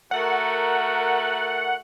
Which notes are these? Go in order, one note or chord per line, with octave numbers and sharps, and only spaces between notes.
A3 F#4 A#4 F#5